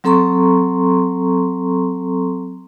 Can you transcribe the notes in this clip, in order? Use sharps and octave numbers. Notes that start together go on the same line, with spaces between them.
F#3 C4 A4 A#5 C6 C#6